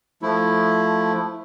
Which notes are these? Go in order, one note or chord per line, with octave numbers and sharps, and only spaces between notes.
F3 A3 E4